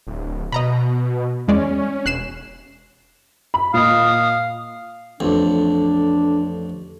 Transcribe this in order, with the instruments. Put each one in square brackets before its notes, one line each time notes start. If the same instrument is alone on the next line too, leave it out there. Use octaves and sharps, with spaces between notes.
[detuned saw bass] D1
[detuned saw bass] B2 [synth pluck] D#5 A#5 B5
[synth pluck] E2 G#3 D5 [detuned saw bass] C#4
[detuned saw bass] E1 [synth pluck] F#6 C7 E7
[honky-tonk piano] B5
[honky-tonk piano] A#2 D#5 [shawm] F5 [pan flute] D#6
[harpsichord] A1 F2 [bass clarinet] D4